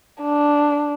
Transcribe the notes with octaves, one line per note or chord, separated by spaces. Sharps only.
D4